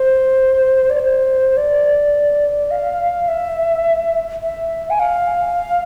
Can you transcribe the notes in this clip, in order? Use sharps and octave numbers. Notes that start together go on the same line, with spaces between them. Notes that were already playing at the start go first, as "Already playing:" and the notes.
Already playing: C5
D5
C5
D5
F5
E5
E5
G#5
F5